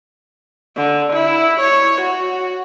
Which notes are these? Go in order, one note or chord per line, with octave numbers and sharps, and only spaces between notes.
D3
E4
C#5
F#4